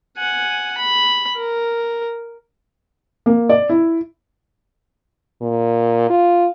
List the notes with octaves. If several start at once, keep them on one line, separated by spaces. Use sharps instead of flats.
F#5 G#5
B5
A#4
A#3
D5
E4
A#2
F4